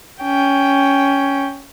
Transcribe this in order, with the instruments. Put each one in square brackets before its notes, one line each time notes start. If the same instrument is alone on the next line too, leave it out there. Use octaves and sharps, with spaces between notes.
[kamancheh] C#4 G5